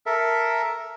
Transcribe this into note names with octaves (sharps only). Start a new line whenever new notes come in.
A4 A#4 E5